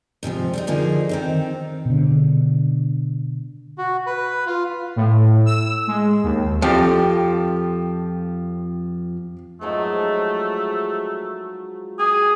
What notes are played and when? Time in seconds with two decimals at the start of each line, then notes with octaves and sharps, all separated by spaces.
0.23 G#2 C3 D#3 F3
0.53 G3 G#3 D#4
0.67 D3 F3 A#3 D#4 G#4
1.09 D#3 C4 D#4
1.85 B2 D3
3.78 F#4
4.07 B4
4.47 F4
4.96 A2
5.46 E6
5.87 G#3
6.24 D#2
6.62 F2 F3 G4
9.61 G#2 F3 F#3 A3
11.99 G4 G#4